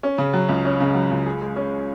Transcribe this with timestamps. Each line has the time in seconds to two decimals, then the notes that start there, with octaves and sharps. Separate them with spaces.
0.03 C#4
0.18 C#3
0.33 F#3
0.49 C#2
0.65 C#4
0.80 C#3
0.95 F#3
1.11 C#2
1.26 G#4
1.41 G#3
1.56 C#4